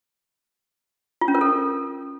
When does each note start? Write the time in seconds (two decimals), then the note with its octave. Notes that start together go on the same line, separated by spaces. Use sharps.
1.21 F4
1.28 C#4
1.35 A#4
1.41 A4